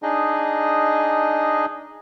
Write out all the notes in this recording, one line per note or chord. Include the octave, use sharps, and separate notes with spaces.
D4 D#4 G#4 D#5